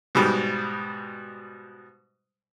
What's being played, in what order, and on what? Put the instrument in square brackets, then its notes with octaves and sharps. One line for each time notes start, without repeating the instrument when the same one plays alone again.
[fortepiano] G#2 B2 G3